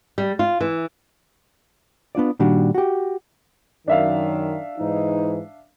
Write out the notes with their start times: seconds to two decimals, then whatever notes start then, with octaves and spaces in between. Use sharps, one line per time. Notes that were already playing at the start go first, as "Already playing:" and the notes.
0.18 G3
0.39 F4
0.60 E3
2.15 B3 D4 F4 D5
2.39 A#2 D#3 G3 D4 F#4
2.75 F#4 G4
3.88 F#2 D#3 D4 E5 F5
4.79 G#2 E3 D#4